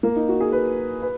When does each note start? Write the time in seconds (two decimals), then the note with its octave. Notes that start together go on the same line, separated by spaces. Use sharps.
0.03 A#3
0.16 D#4
0.28 F#4
0.40 G#4
0.52 B4
1.02 B4